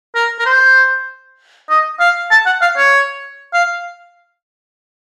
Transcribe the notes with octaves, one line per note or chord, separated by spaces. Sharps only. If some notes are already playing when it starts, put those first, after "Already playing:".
A#4
A#4
C5
D#5
F5
A5
F#5
F5
C#5
F5